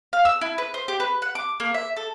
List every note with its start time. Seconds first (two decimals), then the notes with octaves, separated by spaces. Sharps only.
0.13 F5
0.25 E6
0.41 E4
0.58 B4
0.74 C5
0.88 G4
1.00 B4
1.22 F#5
1.35 D6
1.60 A#3
1.74 E5
1.97 A4